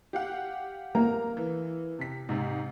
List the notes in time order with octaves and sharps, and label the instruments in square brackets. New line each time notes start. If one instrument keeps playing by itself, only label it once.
[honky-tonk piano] G4 F5 F#5
[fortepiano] A#3 [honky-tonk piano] A#5
[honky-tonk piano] E3
C3 B6
G#2 C3